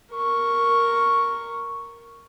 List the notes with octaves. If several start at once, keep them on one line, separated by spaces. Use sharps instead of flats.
A#4 C#6